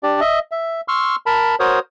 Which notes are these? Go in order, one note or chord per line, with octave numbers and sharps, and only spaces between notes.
D4 G4 D5
D#5 E5
E5
C6 C#6 E6 F6
A#4 A5 B5
F#4 A#4 C5 C#5 D#6